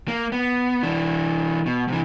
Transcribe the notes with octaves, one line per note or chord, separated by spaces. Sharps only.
A#3
B3
E3 D4
B2
C3 E3